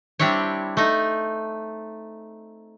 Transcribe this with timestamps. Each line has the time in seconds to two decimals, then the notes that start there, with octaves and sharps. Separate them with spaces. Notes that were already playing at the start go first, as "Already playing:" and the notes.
0.19 G3 C4 D4 E4 C#5
0.77 A3 D#4